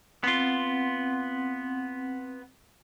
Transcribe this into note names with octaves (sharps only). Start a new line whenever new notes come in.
B3 C4 F4 F#5